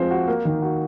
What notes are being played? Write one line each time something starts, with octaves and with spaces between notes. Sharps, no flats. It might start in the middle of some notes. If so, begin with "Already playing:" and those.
Already playing: F3 G#3 C4 C5
F#4
A#3
D#3
F#4